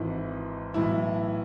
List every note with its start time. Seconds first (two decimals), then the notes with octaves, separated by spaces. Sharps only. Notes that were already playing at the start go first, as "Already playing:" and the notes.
Already playing: G#1 G#2 E3 E4
0.74 B1 A2 E3 E4